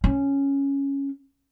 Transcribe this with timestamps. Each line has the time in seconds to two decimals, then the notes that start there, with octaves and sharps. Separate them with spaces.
0.04 C#4